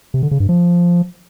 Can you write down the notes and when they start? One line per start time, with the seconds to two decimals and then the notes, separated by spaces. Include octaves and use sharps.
0.14 C3
0.23 D3
0.31 C#3
0.40 G2
0.49 F3